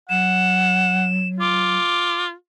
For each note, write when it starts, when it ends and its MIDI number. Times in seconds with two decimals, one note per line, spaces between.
0.10 1.77 54
0.10 1.05 78
0.10 1.28 100
1.40 2.32 65
1.40 2.24 86